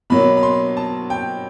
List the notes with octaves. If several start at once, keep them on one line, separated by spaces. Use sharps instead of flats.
B2 F#3 A#3 B5
B5
C6
A5
G5